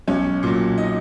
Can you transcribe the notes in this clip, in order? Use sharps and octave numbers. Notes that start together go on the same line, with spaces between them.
B1 C#4 C#5
A#2 F#3
D#4 D#5